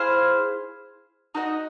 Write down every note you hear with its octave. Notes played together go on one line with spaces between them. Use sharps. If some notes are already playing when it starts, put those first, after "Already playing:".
Already playing: E4 G#4 C5 F5
D#4 F#4 B4 D#5